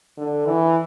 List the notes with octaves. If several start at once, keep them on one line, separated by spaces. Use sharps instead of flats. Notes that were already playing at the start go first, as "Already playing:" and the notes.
D3
E3